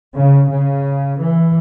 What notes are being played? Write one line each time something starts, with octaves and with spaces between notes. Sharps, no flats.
C#3
C#3
E3